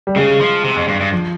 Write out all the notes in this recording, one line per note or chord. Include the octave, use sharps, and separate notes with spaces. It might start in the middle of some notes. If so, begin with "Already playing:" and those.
G3
C#3 G#3
F3
C3
F2
G2
G2
F3